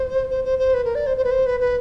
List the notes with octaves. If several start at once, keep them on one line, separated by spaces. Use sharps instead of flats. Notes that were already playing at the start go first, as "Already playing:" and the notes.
Already playing: C5
C5
C5
C5
B4
A#4
D5
C5
C5
B4
C5
B4
B4